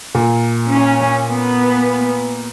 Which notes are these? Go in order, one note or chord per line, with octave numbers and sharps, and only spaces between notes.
A#2
C#4
B3